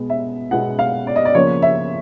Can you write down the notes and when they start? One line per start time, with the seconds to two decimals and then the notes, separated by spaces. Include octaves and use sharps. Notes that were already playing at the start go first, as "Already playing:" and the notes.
Already playing: B2 G#3 B3
0.10 E5
0.51 B2 G#3 B3 F#5
0.79 F5
1.07 D5
1.16 D#5
1.25 D5
1.34 C#3 F3 A#3 C#5
1.62 E5